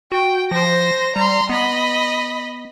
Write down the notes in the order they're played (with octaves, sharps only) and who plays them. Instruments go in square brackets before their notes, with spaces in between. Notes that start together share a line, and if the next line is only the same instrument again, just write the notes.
[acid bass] F#4 [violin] G5
[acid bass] F3 [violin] C5 A#6
[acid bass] G3 [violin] A#5 C6
[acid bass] B3 [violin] D#5 B5